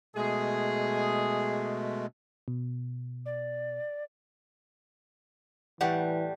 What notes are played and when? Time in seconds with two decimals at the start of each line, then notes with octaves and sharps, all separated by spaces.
0.16 B2 G#3 A3 G#4
2.48 B2
3.26 D5
5.81 A2 E3 G3 F#5